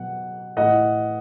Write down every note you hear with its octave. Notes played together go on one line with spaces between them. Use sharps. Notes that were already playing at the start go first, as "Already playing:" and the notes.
Already playing: B2 F#3 F#5
A2 E3 D#5 F#5